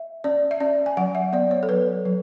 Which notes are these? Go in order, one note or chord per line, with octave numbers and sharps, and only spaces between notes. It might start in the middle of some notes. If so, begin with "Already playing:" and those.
Already playing: E5
C#4 D5
E5
C#4 D5
G#5
F#3 F#5
E5
B3 D5
C#5
A4
F#3 B4
F#3